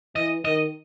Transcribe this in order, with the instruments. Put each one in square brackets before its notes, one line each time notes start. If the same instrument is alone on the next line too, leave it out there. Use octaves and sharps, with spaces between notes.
[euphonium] E3 [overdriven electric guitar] D#5
[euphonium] D#3 [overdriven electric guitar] D#5